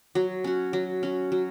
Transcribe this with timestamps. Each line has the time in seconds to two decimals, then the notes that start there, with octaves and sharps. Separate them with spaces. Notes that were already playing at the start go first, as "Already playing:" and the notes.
0.15 F#3
0.44 C#4 F#4
0.73 F#3
1.03 C#4 F#4
1.32 F#3